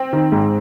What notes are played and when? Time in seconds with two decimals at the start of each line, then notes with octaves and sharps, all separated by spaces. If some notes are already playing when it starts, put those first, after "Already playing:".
Already playing: C4
0.13 D#3
0.32 G#2